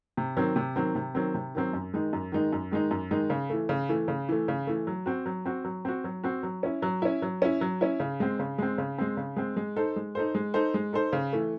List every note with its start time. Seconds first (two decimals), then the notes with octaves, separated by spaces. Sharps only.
0.17 C3
0.37 D#3 F#3 C4
0.56 C3
0.76 D#3 F#3 C4
0.95 C3
1.15 D#3 F#3 C4
1.34 C3
1.55 D#3 F#3 C4
1.73 F#2
1.94 D#3 G#3 D#4
2.13 F#2
2.32 D#3 G#3 D#4
2.53 F#2
2.71 D#3 G#3 D#4
2.91 F#2
3.11 D#3 G#3 D#4
3.30 C#3
3.50 E3 A3
3.69 C#3
3.89 E3 A3
4.08 C#3
4.29 E3 A3
4.48 C#3
4.67 E3 A3
4.87 F#3
5.06 C4 F#4
5.26 F#3
5.45 C4 F#4
5.64 F#3
5.85 C4 F#4
6.04 F#3
6.23 C4 F#4
6.43 F#3
6.63 C#4 E4
6.82 F#3
7.02 C#4 E4
7.22 F#3
7.42 C#4 E4
7.61 F#3
7.81 C#4 E4
8.00 C#3
8.20 G#3 C4
8.39 C#3
8.58 G#3 C4
8.78 C#3
8.98 G#3 C4
9.17 C#3
9.36 G#3 C4
9.57 G#3
9.76 D#4 A4 C5
9.96 G#3
10.15 D#4 A4 C5
10.35 G#3
10.54 D#4 A4 C5
10.74 G#3
10.93 D#4 A4 C5
11.13 C#3
11.33 E3 A3